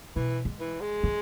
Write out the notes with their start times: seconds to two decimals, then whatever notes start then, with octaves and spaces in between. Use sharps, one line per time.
0.16 B2 E3
0.45 G#3
0.60 E3
0.81 G#3
1.03 D3